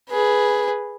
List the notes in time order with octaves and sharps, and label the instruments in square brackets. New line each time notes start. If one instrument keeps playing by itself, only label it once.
[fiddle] G#4 B4